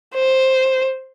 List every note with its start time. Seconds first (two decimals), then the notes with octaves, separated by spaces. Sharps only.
0.15 C5